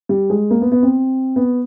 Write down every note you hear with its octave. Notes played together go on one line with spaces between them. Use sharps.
G3
G#3
A#3
B3
B3
C4
B3